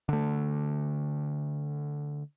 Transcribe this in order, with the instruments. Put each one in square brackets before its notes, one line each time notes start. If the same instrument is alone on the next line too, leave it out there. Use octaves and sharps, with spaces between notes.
[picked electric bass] D3 A3